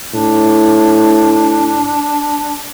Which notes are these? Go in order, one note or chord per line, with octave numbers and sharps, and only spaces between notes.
A2 D4